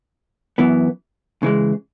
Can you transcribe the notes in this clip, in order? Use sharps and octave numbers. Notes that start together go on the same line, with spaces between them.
F#2 E3 B3
C#3 E3 G#3